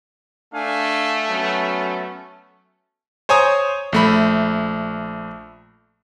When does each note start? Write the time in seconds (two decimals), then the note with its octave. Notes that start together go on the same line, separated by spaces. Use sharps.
0.54 A3 D4 F5 G#5
1.29 F#3 B3 C#4
3.29 C5 C#5 G#5 A#5 D#6
3.93 A#1 A3 B5